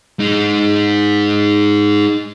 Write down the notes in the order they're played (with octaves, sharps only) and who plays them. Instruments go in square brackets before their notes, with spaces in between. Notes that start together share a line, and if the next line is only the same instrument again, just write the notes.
[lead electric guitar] G#3 D#4